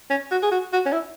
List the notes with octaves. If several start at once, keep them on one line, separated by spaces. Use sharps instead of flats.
C#4
F#4
G#4
F#4
F#4
C#4
E4